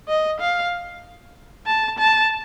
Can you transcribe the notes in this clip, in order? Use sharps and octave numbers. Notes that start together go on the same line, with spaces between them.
D#5
F5
A5
A5